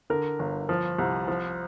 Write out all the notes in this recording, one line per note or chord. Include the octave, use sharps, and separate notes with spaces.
D3 A#4
G1
F3
C2
F3